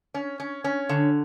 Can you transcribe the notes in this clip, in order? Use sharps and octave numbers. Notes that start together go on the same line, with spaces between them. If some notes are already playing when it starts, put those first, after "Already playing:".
C#4
C#4
C#4
D3